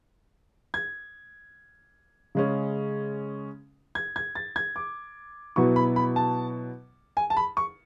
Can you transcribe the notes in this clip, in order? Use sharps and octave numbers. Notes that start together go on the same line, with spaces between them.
G#6
C#3 G#3 C#4
G#6
G#6
A6
G#6
D6
B2 F#3 B3 E4 C#6
B5
B5
A5
G#5
A5
B5
C#6